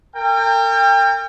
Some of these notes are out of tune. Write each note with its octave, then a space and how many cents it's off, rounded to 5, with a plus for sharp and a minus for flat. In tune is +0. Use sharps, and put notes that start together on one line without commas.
A#4 -40 G5 +30